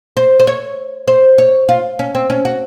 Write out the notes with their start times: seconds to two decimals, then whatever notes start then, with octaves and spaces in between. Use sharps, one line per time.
0.17 C5
0.40 C5
0.47 C#5
1.08 C5
1.38 C#5
1.69 F4
1.99 C#4
2.15 C4
2.30 C#4
2.45 F#4